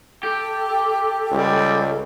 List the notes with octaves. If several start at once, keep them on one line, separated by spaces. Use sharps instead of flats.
G4 A4
C#2 G3